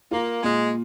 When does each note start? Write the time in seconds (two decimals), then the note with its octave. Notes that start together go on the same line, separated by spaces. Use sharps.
0.11 A#3 F4
0.43 A#2 G#3